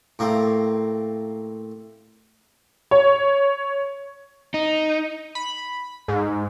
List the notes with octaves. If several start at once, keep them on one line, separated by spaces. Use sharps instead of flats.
A2 A#3 C4
C#5
D#4
B5
G#2